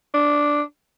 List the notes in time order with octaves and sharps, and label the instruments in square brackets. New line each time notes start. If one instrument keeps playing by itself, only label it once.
[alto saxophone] D4